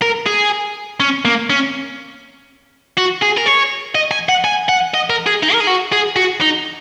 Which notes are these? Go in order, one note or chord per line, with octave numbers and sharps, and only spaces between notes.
A#4
G#4
C#4
A#3
C#4
F#4
G#4
A#4
C#5
D#5
G#5
F#5
G#5
F#5
D#5
A#4
G#4
D#4
A#4
G#4
F#4
G#4
F#4
D#4